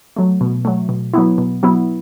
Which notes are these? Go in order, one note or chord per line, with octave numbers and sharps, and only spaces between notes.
F#3 A3
B2
F#3 A3
B2
F#3 B3 E4
B2
F#3 B3 E4